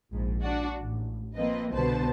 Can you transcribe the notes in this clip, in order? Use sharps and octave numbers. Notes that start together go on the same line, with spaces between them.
A#1 G#2
D4 F#4 D5
A1
F3 A#3 C4 B4 D#5
C2 B2 D3 B4 C5 A5